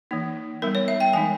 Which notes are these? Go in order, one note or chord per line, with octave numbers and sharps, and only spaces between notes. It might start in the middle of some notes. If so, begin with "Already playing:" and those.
E3 A#3 D#4
G3 B3 D#4 A#4
C#5
E5
G5
E3 G#3 D#4 G#5